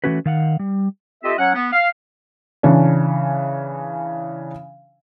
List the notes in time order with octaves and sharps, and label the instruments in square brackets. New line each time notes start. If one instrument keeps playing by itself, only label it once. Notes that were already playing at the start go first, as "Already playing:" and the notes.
[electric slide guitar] E3 G3 A3 C#4 F#4 B4
D#3 F5 F#5
G3
[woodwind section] C4 F4 G4 A4 D#5 E5
F#3 C#4 C#5 F#5
B3
F5
[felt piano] C#3 E3 C#4 D4